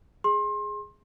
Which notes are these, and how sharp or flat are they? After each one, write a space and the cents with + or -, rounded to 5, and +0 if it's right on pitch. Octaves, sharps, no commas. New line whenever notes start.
G#4 +0 C6 +30